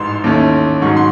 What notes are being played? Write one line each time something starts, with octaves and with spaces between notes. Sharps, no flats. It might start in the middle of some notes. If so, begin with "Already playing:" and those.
Already playing: A1 G#2 C6
D#2 D#3 A3 C#4 E4
G#2 D#3 F#3 C#6
C6